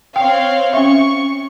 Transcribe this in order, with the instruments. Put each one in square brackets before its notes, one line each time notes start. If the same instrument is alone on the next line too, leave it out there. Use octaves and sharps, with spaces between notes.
[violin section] C4 C#5 F5 [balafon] G5
[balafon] C#4 E5 [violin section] C#6